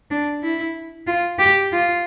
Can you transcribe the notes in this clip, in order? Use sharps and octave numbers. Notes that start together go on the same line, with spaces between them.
D4
E4
F4
G4
F4